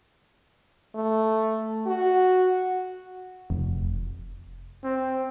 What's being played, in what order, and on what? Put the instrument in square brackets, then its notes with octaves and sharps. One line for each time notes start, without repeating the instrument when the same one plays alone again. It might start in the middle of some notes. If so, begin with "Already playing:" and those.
[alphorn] A3
F#4
[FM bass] F1
[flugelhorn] C4